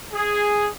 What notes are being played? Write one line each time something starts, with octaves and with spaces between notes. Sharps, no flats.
G#4